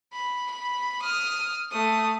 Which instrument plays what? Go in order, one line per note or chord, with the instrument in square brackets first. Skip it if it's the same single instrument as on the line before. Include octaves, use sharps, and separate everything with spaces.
[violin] B5
B5
D#6 F6
A3 D#6